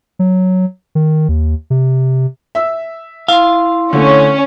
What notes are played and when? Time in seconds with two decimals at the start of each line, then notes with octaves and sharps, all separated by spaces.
0.19 F#3
0.95 D#3
1.29 D#2
1.70 C3
2.55 E5 E6
3.28 E4 F5 C6
3.93 D3 A3 C#4